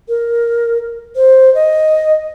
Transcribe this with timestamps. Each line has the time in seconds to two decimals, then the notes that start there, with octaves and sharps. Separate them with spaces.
0.09 A#4
1.16 C5
1.55 D#5